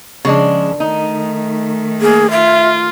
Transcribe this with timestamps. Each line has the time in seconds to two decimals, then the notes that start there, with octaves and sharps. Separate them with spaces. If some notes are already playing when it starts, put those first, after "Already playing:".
0.25 C#3 F3 G#3 D4
0.80 D#3 A3 D#4
2.01 A#3 G#4
2.31 F4 E5